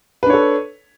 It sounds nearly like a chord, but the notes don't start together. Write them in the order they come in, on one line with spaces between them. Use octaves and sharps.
B4 D4 C#5 A4